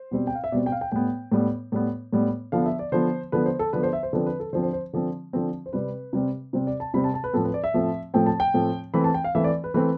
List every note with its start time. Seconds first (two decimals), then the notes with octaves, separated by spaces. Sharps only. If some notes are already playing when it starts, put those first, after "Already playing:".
Already playing: C5
0.11 B2 G3 C4
0.27 G5
0.35 F5
0.44 E5
0.52 B2 G3 C4 D5
0.66 G5
0.72 F5
0.81 G5
0.92 A2 G3 B3 G5
1.32 A2 G3 B3
1.72 A2 G3 B3
2.13 A2 G3 B3
2.52 D3 F3 B3 F5
2.66 E5
2.79 D5
2.92 D3 F3 B3 C5
3.32 D3 F3 B3 B4
3.46 C5
3.59 A4
3.73 D3 F3 B3 B4
3.83 C5
3.93 E5
4.03 C5
4.13 D3 F3 C4 B4
4.26 B4
4.40 A4
4.53 D3 F3 C4 C5
4.63 C5
4.73 C5
4.93 D3 F3 C4
5.33 D3 F3 C4
5.66 C5
5.73 C3 G3 C4 B4
6.13 C3 G3 C4
6.53 C3 G3 C4 C5
6.67 D5
6.80 A5
6.94 C3 G3 C4 B5
7.04 A5
7.14 A5
7.24 B4
7.33 A2 F3 A3 C4 A4
7.44 B4
7.54 D5
7.64 E5
7.74 A2 F3 A3 C4
8.14 A2 F3 A3 C4 G5
8.26 A5
8.40 G5
8.54 A2 F3 A3 C4
8.94 E3 A3 C4 B5
9.04 A5
9.14 G5
9.24 F5
9.35 E3 A3 C4 E5
9.44 D5
9.64 B4
9.74 E3 A3 C4 B4